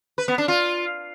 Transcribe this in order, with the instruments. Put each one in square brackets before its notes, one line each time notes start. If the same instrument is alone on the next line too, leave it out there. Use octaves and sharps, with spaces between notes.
[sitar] B4
B3
D4
F4